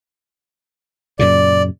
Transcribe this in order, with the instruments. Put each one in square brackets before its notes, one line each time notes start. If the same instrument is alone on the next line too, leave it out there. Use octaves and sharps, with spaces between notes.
[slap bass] F#2 A#2 C#3 [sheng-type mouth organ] D5